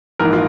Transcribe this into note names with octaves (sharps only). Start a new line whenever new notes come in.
A#1 G#2 E3 A#4
F4